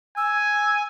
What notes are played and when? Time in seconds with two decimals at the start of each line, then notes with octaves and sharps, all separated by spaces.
0.17 G#5 E6